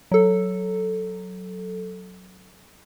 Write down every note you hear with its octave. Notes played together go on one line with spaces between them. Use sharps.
F#3 A4